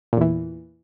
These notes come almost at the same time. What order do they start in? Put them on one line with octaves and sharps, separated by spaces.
A#2 E2 E3